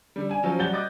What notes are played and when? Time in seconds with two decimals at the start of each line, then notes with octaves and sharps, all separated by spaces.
0.16 D3 G3
0.29 D4 G#5
0.43 F3 F#3 C#4
0.59 F#3 G3 F#5 G6 A6 G7
0.73 D#5 D6 F#6 A6